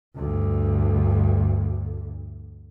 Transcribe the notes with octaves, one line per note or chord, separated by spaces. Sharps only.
D2 G2